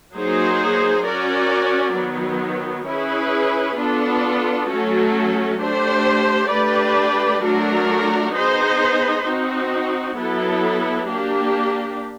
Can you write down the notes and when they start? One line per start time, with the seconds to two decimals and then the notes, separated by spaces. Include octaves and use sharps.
0.13 F#3 A#3 D#4 G#4 C5
1.05 C#4 F#4 A#4 D5
1.96 D#3 F#3 B3
2.87 C#4 E4 G#4 B4
3.79 B3 D4 F4 A4
4.69 F#3 A3 C#4 F#4 A4
5.61 A3 D4 G4 C5
6.51 A3 D4 G4 B4 D5
7.43 F#3 A3 D4 F#4 A#4
8.34 B3 D#4 G#4 C5
9.25 C4 D#4 F#4
10.16 F#3 B3 E4 A4
11.06 A#3 D4 G4